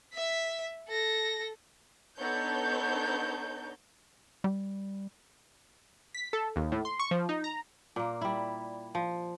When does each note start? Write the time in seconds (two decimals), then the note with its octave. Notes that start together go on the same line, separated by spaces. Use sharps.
0.14 E5 B6
0.88 A4 A#6
2.17 B3 D4 D#4 A4 C#5 G6
4.44 G3
6.14 B6
6.33 A4
6.56 D#2
6.72 A2
6.85 C6
6.99 C#6
7.11 F3
7.29 D#4
7.44 A#5
7.96 A#2 A#3
8.21 G3 E4
8.95 F3